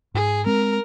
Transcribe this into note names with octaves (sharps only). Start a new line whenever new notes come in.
G#2 G#4
G#3 C4 A#4